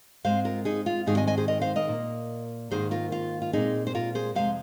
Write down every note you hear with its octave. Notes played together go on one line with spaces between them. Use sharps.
G#2 G#3 C4 C5 F5
F4 A#4
D#4 G#4
F4
G#2 D#3 G#3 C4 D#4 G#4
D#5 G#5
D#5 G#5
G#4 C5
A#4 D#5
C5 F5
A#4 D#5
A#2 A#3
G#2 D#3 A#3 G#4 C5
F4 A#4
F4
F4
A#2 G#3 C4 D#4 G#4
C5
F4 A#4
G#4 C5
F2 C3 G#3 C5 F5